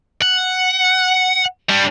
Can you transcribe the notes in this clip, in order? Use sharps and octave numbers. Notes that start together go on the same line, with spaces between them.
F#5
G3 D4